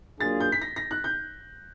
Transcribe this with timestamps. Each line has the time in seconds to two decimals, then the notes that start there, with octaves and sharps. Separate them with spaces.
0.20 F#3 A#3 D4 F4 G#4 A6
0.40 G6
0.52 B6
0.62 A#6
0.76 A#6
0.91 F#6
1.04 G6